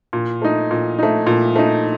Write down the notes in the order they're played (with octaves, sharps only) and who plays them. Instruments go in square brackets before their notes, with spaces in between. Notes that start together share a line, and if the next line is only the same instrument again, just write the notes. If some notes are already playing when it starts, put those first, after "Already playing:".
[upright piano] A#2
A3 D#4
A#2
A3 D#4
A#2
A3 D#4